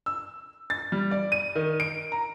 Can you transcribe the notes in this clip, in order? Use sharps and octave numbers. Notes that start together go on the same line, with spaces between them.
E6
A6
G3
D5
D#7
D#3
D7
A#5